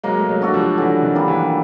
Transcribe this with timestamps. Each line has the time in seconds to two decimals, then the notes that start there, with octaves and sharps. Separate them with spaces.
0.04 F#3 G#3 A#3
0.18 A3
0.29 F#3 G#3
0.41 D4 F#4 A4
0.54 F3 G3
0.78 D3 E3 F#3
1.03 D#3
1.15 G3 A#3 D4
1.28 E3